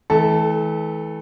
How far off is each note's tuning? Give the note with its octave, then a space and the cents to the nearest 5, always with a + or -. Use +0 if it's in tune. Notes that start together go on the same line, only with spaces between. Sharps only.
E3 -35 A3 -35 A4 +0